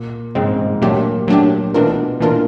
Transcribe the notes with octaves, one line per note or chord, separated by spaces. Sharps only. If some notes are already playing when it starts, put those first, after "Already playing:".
Already playing: A#2
G#2 C#3 F3 G#3 C4
G#2
A#2 F#3 A3 D4 G4
F#3 A3 D4 G4
B2 E3 A3 D4 F4 A#4
A#2 E3 A3 D4 F4 A#4